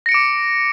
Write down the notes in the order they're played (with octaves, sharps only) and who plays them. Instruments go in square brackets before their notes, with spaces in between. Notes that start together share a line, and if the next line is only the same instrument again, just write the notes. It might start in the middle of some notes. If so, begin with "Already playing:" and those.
[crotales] A#6
C#7
D7
D6